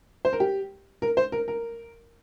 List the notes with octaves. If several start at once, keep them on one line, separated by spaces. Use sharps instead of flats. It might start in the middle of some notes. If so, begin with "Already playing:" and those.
C5
A#4
G4
A#4
C5
A#4
A#4